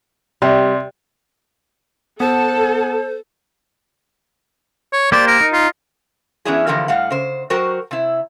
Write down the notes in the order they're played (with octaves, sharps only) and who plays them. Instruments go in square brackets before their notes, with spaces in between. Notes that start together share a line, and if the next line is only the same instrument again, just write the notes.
[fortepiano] C3 [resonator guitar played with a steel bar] G3
[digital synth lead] B3 [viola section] A4 [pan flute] C5 [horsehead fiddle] F#5 A5
[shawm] C#5
[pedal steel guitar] A#3 G4 C5 [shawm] D5
[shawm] A#4
[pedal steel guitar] D#4
[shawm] F4
[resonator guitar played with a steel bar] E3 B3 C#4 D4 E4 G#4
D3 E3 F3 A#3 G4 A#4
A2 G3 F5 F#5
C#3 C5
F#3 F#4 A#4 C5 G5
C3 E4